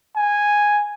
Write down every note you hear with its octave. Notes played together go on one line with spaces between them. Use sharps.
G#5